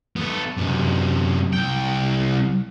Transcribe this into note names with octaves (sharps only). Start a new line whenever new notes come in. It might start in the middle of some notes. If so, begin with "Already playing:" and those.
B3 A4
F#2 C3
C2 G5